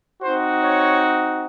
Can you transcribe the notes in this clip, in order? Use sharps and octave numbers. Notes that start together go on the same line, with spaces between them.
C4 D#4 F#4 C5
C#5